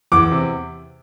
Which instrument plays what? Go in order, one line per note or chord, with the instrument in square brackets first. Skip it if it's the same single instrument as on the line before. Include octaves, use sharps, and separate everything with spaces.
[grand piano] E2 D6
C3